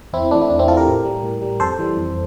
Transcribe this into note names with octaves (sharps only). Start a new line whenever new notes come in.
E2 C4 E4
E3 A3 D4
E4
E2 D4
C4 E4
E3 A3 F4 A4
G4 A#4
A2
G3
A2
G3
F2 A4 C5
E3 G3
F2